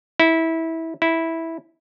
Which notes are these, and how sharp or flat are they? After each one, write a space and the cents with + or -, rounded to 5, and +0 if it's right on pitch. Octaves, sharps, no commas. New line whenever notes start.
E4 -20
E4 -10